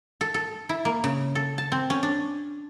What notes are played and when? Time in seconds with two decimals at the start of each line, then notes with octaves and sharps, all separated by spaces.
0.21 A4
0.34 A4
0.69 E4
0.85 A#3
1.04 C#3
1.35 A4
1.58 A5
1.72 C4
1.90 C#4
2.03 D4